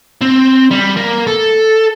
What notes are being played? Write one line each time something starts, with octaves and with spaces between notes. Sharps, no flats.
C4
G3
A#3
A4